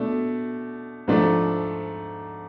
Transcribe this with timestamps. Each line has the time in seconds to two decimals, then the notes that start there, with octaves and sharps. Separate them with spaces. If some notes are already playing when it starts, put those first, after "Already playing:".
Already playing: B2 A3 D4
1.08 G#2 F3 A3 D4